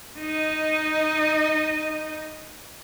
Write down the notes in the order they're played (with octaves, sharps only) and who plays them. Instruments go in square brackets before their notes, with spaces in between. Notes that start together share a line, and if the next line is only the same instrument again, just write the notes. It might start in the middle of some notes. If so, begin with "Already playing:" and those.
[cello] D#4 D#5